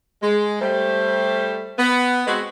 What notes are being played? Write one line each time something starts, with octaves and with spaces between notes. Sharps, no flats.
G#3
G3 A3 C5
B3
G#3 B3 C4 F#4 B4 D#5